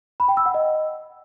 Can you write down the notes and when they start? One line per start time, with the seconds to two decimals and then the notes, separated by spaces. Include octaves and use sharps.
0.20 B5
0.28 G5
0.37 E6
0.46 F#5
0.54 D#5